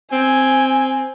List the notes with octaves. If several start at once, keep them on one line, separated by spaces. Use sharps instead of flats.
C4 G#5